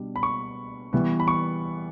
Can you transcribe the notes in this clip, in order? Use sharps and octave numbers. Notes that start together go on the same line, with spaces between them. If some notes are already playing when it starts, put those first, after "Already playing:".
Already playing: B2 G3 D4
B5
C#6
E3 G3 B3
B5
C#6